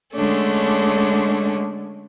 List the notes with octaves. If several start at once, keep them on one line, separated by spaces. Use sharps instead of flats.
D3 G#3 A3 C#4 D4